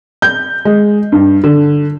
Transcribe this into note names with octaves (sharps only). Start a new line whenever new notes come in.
G6
G#3
G2
D3